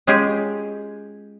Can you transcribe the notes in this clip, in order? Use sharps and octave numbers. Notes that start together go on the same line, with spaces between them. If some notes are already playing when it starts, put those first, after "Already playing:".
G#3 C#4 F4 G4 G#4